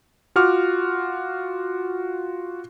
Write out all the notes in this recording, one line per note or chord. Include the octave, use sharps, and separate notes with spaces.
F4 F#4 D6 F6